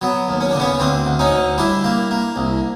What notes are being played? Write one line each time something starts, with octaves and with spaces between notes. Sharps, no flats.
F#3 B3
D#2
C#4
C#3 D4
B3 C#4
D2 C4 D4
D2
C#4 D#4
D2
G3 D4 E4
A#3
A#3
C2